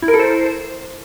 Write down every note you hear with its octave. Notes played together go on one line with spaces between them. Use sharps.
E4
A#4
A4
C5